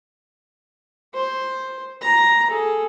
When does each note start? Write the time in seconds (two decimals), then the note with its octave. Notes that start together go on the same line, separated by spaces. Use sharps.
1.14 C5
2.02 A#5
2.50 G#4 A4